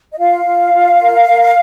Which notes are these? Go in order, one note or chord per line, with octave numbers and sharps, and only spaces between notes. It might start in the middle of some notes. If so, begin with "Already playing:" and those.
D#5
F4 F5
F4
F4
A#4
A#4